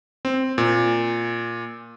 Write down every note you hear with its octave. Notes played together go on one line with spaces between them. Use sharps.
C4
A#2